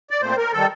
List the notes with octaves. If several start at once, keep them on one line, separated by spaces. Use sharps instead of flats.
D5
A#2 A3 C4 C5
A#4
D#3 G3 A4